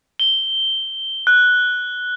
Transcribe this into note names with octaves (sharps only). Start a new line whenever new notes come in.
G7
F#6